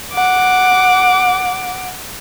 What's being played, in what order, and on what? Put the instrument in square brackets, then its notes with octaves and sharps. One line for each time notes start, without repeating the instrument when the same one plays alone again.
[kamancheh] F#5 D6